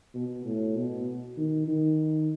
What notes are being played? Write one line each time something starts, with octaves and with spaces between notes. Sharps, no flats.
B2
A2
B2
D#3
D#3